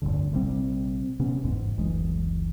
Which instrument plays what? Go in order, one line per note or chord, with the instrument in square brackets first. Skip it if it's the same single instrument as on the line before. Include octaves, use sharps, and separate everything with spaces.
[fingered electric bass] F1 D2 G2 D3
A#1 C3 G3 C4
C3 B3 C#4
G1 E2 G#2
F#1 D2 E3 G#3